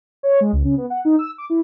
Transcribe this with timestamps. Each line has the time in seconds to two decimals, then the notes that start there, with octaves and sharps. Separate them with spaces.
0.23 C#5
0.41 G#3
0.53 C#2
0.64 C#3
0.77 B3
0.90 F#5
1.05 D#4
1.19 E6
1.38 D6
1.50 E4